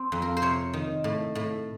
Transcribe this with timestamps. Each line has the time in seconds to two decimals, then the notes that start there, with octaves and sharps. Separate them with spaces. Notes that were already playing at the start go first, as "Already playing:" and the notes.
Already playing: C4
0.12 F2
0.22 A#4
0.37 C5
0.42 C3 C#5
0.74 D#3
1.04 A2
1.35 A2